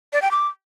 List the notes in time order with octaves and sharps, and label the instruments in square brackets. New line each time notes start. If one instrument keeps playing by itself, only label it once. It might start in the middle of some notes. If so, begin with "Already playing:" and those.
[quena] D5
G5
D6